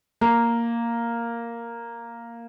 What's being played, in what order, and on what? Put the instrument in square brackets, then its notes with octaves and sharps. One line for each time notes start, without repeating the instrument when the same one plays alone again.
[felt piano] A#3